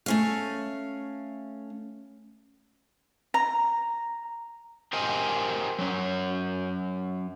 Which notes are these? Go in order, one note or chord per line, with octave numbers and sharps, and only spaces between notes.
A3 C#4 F5
A#5
G4 A#4 C5 D#5 G#5
F#3 C#4